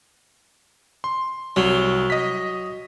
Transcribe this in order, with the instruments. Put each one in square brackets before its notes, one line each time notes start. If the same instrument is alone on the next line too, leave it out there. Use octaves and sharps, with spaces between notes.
[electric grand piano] C6
[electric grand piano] C2 [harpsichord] F#3
[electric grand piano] D#5 B6